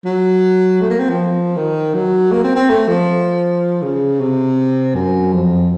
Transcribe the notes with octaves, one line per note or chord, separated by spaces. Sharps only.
F#3
A3
A#3
C4
F3
D#3
F#3
A#3
C4
C4
A3
F3
C#3
C3
F#2
F2